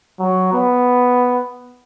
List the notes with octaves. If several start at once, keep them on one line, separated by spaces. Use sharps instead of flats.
F#3
B3